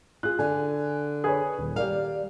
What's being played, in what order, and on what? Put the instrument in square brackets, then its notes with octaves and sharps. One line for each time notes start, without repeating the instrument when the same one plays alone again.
[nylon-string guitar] F4 G#4 [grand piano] F#6
[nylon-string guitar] D3 [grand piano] G#5
[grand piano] G#4 B4 C#5
D#1
[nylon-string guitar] G3 D5 F5 [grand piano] G4 A#4